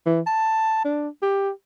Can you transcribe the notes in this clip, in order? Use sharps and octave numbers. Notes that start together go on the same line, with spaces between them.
E3
A5
D4
G4